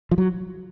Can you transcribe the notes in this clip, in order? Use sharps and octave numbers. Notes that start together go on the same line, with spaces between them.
F3
F#3